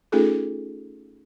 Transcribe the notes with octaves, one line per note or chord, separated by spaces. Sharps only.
A3 C#4 D#4 F4 G#4 A4